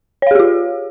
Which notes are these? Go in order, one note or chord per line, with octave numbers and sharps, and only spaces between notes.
F4 G4 G#4 C#5 F5